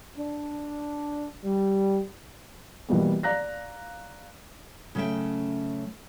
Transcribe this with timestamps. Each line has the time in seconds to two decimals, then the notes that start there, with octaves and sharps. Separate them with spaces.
0.17 D4
1.44 G3
2.89 B2 E3 G3 A#3 B3
3.23 D5 F5 A#5 F#6 A#6
4.95 C#3 F#3 A3 C#4 E5 G5